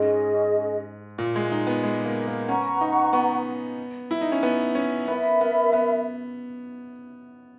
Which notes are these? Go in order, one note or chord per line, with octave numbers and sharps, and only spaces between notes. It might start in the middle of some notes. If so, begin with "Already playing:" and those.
Already playing: G#2 C#4 G#4 D#5
A#2
G#3
D#4
B3
G#3
A#3
A#3
C#4 B4 F#5 A#5 C#6
D#4
B3
E4
D#4
C#4
B3
C#4
B3 A#4 E5 B5
B3
B3